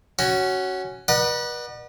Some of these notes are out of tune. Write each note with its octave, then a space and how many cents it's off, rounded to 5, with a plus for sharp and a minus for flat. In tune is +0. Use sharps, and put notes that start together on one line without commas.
C#4 +0 F#4 +15
B4 -40 D5 +45 F#5 +0